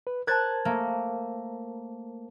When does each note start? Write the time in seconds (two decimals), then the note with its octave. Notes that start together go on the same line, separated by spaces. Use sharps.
0.07 B4
0.27 A#4 C5 A5 F#6 G#6 A6
0.65 A3 A#3